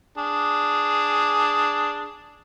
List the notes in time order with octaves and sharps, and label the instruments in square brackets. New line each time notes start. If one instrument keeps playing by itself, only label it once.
[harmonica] D4 G#4